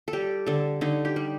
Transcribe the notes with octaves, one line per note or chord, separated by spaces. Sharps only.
A4
G3 G4
D3 A4
D3 D#4
G4
G3